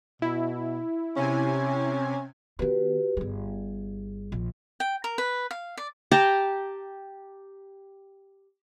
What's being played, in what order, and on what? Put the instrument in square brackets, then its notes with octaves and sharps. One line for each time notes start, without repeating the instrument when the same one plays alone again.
[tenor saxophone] B2 [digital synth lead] E4
[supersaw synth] C3 G#5 [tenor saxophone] C#4
[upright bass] D#3 B3 [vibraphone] F#4 G4 B4
[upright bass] G1 G3 [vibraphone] G#4
[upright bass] A#1
[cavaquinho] G5
A#4
B4
F5
D5
[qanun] G4 G5 A5 A#5